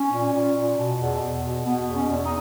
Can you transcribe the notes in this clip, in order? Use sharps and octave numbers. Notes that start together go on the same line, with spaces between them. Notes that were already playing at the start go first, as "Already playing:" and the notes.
Already playing: C#4
A#2
A#2
A#2
B2
E2
E2
B2
B2 B3
E2 B3
C#4
E2
D#4